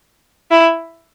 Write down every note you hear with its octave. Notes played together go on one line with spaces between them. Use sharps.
E4